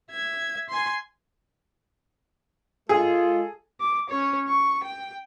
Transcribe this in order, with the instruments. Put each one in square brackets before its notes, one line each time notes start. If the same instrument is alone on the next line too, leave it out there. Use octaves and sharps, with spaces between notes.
[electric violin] E5 G#6
G#5 C6
[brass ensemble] G#3 F4 [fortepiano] G#4 [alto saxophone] A4
[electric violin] D6
C#4 C#5
C#6
G5